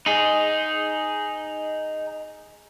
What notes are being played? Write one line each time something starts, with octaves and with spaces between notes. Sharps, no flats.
D#4 G#4